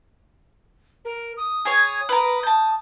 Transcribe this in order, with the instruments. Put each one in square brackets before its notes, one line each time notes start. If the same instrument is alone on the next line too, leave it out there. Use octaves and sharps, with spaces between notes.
[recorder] A#4
D#6
[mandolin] G#4 C#5 G#5
A#4 B4
A5 G6